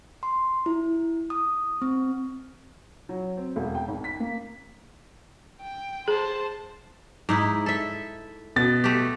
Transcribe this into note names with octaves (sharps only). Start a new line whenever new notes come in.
C6
E4
D#6
C4
F#3
C4
E1
G5
G#1
B6
A#3
G5
G#4 C5 A5
G#2 D#4 E4
A4 E5
B2 A6
A3 G4